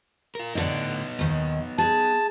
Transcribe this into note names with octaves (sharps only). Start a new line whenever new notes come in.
F4 A#4
A2 D3 B3 D#4 D5
D#2 D#3
G#4 A5